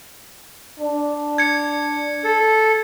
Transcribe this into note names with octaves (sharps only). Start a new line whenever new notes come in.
D4
G#6 C#7
A4